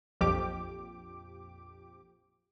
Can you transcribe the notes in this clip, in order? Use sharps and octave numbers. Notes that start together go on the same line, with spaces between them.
A#1 F2 F3 G4 D6